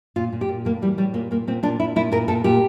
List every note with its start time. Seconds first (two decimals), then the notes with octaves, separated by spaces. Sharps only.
0.16 A#2 F4
0.33 A#2
0.41 G4
0.49 A#2
0.65 A2 A#3
0.82 E3 G3
0.98 A2 G3
1.14 A#2 A#3
1.31 A#2 A#3
1.47 A#2 C4
1.63 A#2 D4
1.80 A#2 E4
1.96 A#2 E4
2.12 A#2 A#4
2.28 A#2 A4
2.44 A#2 G4